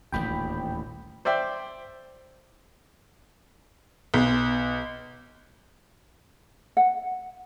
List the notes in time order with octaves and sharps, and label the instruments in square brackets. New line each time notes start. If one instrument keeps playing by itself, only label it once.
[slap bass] D#1 A1 D2 [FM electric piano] G5 B5
[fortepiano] C5 D5 E5 G5
[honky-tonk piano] B1
[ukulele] F#5